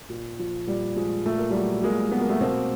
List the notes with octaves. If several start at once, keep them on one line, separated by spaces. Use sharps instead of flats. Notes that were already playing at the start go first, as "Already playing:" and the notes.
A#2
F3
A#2 G3
F3 G#3
A#2 A3
A#3
F#3 G3 A3
A#2 G#3 A#3
F#3 B3
A#3
A3 B3
B2 A#3 C4